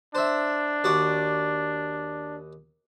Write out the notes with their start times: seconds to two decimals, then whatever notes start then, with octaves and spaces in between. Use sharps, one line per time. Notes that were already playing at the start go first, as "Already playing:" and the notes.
0.15 D4 C5 E5
0.84 D#2 F#4 D5